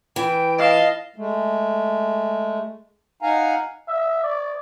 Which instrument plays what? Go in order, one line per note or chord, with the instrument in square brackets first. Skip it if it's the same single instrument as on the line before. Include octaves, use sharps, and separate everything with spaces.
[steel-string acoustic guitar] E3 [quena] G5
[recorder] D#5 [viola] F5 A5
[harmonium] G#3 A3
D#4 F5 F#5 G#5 A#5
[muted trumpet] E5
D5